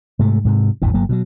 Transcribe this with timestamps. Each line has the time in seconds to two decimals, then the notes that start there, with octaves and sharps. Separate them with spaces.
0.19 G#2 C3 A3
0.45 G#2 C3
0.82 A1 E2 G2 E3
0.94 G1 F#3 A#3
1.09 B2 F3 F#3